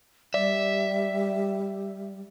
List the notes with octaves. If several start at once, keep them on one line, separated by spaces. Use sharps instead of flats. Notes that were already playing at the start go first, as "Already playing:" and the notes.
G3 D5 E5